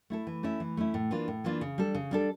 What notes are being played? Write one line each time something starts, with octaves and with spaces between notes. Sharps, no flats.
A3 E4 A4
E3
A3 C#4 E4
E3
A3 C#4 E4
A2
E3 A#3 D4 F4
A2
E3 A#3 D4 F4
C#3
G3 D4 A4
C#3
G3 D4 A4